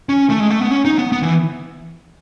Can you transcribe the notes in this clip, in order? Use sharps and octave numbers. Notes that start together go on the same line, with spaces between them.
C#4
A3
G#3
A3
B3
C#4
D#4
B3
B3
E3